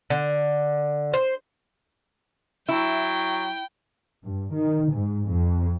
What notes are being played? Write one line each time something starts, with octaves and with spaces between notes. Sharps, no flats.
D3
C5
F#3 E4 G5
G2
D#3
G#2
F2